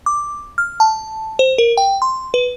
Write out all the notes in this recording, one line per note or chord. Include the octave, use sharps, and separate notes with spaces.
D6
F6
A5
C5
A#4
G5
C6
B4